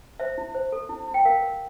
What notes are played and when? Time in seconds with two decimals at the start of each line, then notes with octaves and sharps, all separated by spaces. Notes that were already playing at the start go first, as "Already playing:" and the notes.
0.20 C5 E5
0.38 E4
0.55 C5
0.72 A4
0.89 E4
1.08 E4
1.14 G5
1.25 A#4 F5
1.42 A#4